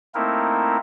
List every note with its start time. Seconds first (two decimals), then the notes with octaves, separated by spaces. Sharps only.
0.15 A3 A#3 C4 D#4 E4 A#4